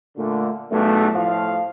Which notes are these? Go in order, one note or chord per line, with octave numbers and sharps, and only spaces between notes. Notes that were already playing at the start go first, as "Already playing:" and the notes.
A#2 D3 A3
B1 E2 G2 A3
A2 F3 F5